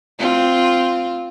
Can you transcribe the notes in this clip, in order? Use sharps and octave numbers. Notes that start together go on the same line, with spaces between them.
C4 F4